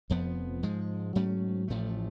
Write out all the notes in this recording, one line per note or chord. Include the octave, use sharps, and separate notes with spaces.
F1 F2 F3 B3
G#2 F3 G#3
G#2 F#3 A3 C#4
A1 A2 F3 A3